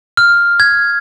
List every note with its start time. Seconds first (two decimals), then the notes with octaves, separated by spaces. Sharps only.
0.17 F6
0.60 G#6